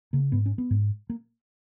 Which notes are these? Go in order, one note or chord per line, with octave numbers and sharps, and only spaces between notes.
C#3 A#3
G#2 B3
C#4
B3
G#2
A#3